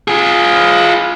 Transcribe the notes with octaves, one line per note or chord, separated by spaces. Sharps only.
F4 G#4